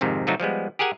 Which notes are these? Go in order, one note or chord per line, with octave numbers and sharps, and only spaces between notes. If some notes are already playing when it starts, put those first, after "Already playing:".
F2 G#2 C3 D#3
C3 F3 F#3 A3 D#4 F#4
F3 G3 G#3 B3
G4 G#4 A#4 F#5 G#5